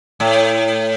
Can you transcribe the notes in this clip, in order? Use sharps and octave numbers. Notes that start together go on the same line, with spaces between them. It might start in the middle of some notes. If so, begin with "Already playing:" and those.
A2